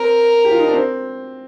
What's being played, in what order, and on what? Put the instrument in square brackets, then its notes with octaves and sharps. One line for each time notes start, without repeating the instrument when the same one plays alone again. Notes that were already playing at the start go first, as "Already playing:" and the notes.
Already playing: [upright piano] C4 [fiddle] A#4
[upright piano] G4
F4
D#4
D4
C4